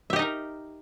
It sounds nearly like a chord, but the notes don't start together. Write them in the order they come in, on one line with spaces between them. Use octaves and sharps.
E5 G4 D#5 D#4 A#4